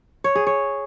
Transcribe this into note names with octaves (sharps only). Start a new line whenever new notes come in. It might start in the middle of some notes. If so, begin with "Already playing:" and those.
C#5
G#4
C#5